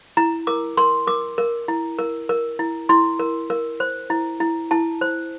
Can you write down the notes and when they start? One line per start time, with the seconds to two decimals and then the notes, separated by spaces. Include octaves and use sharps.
0.17 E4 A#5
0.47 A#4 D6
0.77 A#4 C6
1.07 A#4 D6
1.38 A#4
1.68 E4
1.99 A#4
2.29 A#4
2.59 E4
2.89 E4 C6
3.19 A#4
3.50 A#4
3.80 C5
4.10 E4
4.40 E4
4.71 E4 A5
5.01 C5